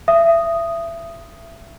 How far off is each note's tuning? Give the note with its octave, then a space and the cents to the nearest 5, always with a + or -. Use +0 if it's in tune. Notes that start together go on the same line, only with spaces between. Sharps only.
E5 +25 D#6 +0